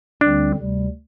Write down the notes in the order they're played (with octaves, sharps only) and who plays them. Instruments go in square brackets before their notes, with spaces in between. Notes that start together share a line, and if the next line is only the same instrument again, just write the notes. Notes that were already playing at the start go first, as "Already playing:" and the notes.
[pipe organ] D2 D3 G3 C4 [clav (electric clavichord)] D4
[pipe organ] D2 C3 G3